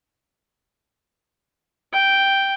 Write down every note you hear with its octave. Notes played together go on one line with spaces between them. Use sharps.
G5